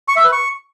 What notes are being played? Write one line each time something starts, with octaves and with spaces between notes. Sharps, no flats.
C#6
E5
B4
C#6